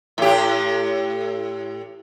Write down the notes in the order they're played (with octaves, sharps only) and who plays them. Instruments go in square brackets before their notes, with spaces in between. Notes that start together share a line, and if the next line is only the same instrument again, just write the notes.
[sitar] A2 G4